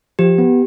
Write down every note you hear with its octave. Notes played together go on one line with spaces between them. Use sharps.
F3 G4
B3